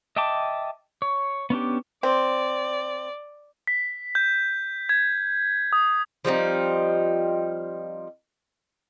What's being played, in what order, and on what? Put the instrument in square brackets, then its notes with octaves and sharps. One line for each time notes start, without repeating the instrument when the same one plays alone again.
[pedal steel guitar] D#5 E5 G5 A5 D6
C#5
B3 C#4 D4 G4
[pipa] C4 [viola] D5
[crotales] B6
G6
G#6
D#6
[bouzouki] F3 G3 C4 D#4